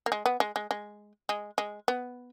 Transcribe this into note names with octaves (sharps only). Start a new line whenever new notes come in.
A#3
G#3
B3
G#3
G#3
G#3
G#3
G#3
B3